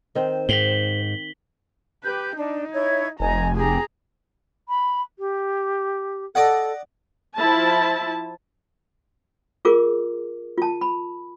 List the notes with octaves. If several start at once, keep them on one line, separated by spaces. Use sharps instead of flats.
D#3 C4 C5
G#2 B6 F#7 G7
G4 B4 G6
D4 D#4
E4 C#5 G#6
F1 D#4 G#5 A#5
G4 G#4 G#5 A#5
B5
G4
A4 D5 D#5 F#5
F3 E4 A5
F4 G#4 A#4 D6
F4 A5
B5